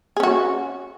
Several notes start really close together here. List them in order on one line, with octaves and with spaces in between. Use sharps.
G#4 C#4 F#4